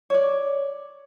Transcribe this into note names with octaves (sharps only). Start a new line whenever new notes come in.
C#5 D5